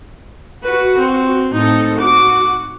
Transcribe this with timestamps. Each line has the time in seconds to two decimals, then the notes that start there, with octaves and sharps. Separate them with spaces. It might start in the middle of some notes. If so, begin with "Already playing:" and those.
0.63 F#4 B4
0.98 C4
1.54 A2 C4 D#4 A4
2.00 F#4 D6